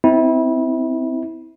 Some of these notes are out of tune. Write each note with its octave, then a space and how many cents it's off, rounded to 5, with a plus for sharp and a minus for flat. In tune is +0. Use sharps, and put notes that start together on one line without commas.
C4 -20 E4 -30